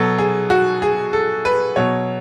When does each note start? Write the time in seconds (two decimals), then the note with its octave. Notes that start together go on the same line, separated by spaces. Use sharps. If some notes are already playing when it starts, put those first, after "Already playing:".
Already playing: B2 F#3 A4
0.18 G#4
0.50 F#4
0.82 G#4
1.13 A4
1.45 B4
1.76 B2 F#3 C#5